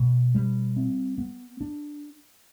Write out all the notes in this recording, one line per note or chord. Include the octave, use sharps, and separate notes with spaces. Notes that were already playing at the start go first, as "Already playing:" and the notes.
Already playing: B2
G3
C4
B3
D4